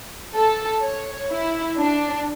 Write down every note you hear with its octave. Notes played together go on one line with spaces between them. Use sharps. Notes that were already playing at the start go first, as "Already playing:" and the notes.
A4
C#5
E4
D4